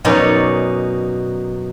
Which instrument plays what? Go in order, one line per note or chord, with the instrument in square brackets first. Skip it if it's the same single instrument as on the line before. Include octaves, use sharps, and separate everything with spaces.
[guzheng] F#2 B2 D#4 C#5 D5